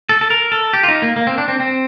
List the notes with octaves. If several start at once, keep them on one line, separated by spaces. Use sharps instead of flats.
A4
A4
A#4
A4
G4
F4
D#4
A#3
A#3
C4
D4
C4
C4